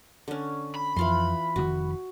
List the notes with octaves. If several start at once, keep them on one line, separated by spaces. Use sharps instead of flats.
D3 C#4
B5
F2 E3 F4 C6
F1 B2 D#3 F#4